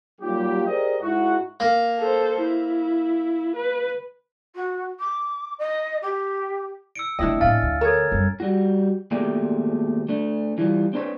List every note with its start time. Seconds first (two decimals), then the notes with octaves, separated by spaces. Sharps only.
0.21 F#3 G3 A#3 D#4 F4 G4
0.66 G4 G#4 A#4 C5 D5 D#5
1.01 G#2 G#3 D#4 E4 F#4
1.60 A#3
1.99 A4 C5
2.42 E4
3.56 B4
4.55 F#4
4.99 D6
5.59 D#5
6.02 G4
6.95 E6 C#7 D7
7.19 F1 A3 D4 E4 D#5 G5
7.41 A2 C4 F5 G#5 F6 A6
7.62 D2
7.81 A4 A#4 C#5 A#5 G#6
8.12 F#2 G3
8.40 G3 F#4
9.11 D#2 B2 G#3 A3 G4 D5
10.08 A3 D4
10.58 E3 G3 F4
10.93 C4 D4 G#4 A#4 B4 C#5